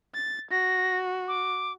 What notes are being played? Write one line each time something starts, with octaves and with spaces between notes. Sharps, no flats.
A6
F#4 A#6
D6